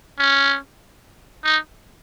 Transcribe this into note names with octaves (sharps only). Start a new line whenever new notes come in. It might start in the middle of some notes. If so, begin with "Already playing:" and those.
C#4
D#4